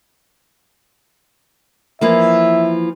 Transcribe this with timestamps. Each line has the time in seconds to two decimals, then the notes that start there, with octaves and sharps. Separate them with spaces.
2.01 E3 F3 A#3 E5